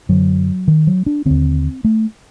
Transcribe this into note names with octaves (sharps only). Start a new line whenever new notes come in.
F#2 D3 F#3
D#3
F#3
D4
D#2 D3 C4
A3